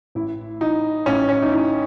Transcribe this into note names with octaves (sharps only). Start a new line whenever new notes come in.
A1 E4
E3 D#4
A1 C#4
C#4
D#4
E3 E4